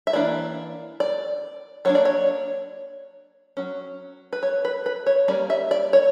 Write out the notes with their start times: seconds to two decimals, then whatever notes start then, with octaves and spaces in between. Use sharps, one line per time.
0.07 E5
0.13 E3 A#3 D4 D5
1.00 D5
1.85 F#3 A#3 D4 C#5
1.95 D5
2.05 C#5
3.57 F#3 C#4
4.33 B4
4.43 C#5
4.65 B4
4.86 B4
5.06 C#5
5.28 G3 A#3 C#4 D5
5.50 E5
5.71 D5
5.93 C#5